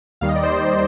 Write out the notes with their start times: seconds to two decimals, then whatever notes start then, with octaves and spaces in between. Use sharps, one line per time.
0.21 D#2 D#3 G3 F5
0.29 D#5
0.35 D5
0.43 C5 D#5